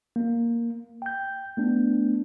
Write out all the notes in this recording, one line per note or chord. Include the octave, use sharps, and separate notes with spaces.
A#3
G5 G6
A3 B3 D4